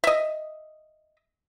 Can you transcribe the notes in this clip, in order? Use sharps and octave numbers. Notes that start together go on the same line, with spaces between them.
D#5 E5